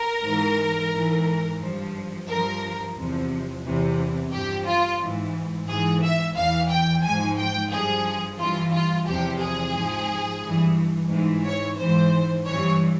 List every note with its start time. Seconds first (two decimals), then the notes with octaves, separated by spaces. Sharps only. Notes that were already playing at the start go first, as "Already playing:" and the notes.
Already playing: A#4
0.25 G#2 E3
0.92 G#2 E3
1.61 G2 F3
2.28 G2 F3 A#4
2.97 E2 C3 F3
3.64 E2 C3 E3
4.32 G2 F3 G4
4.66 F4
5.00 G#2 E3
5.68 G#2 E3 G#4
6.02 E5
6.35 E2 E3 F5
6.70 G5
7.03 G#2 F3 G#5
7.37 G5
7.71 G2 F3 G#4
8.39 G2 E3 F4
8.73 F4
9.07 E2 C3 F3 G4
9.41 G#4
9.74 G#2 F3
10.43 G2 E3
11.11 G#2 E3
11.45 C#5
11.78 G#2 E3 C5
12.46 G2 E3 C#5